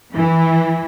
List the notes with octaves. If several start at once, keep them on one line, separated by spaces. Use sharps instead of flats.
E3